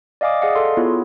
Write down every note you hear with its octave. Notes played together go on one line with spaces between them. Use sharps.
D5 D#5 F5 G#5 D6 D#6
G#4 D5 D#5 F5 F#5
A4 C6
B3 E4 F4 G#4 C#5